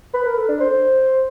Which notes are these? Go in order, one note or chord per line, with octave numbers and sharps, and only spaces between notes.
B4
A#4
A4
D4
C5